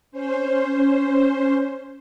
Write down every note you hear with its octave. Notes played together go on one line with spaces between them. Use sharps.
C#4 C5